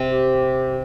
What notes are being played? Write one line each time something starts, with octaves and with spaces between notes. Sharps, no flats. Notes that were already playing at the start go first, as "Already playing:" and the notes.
Already playing: C3
G4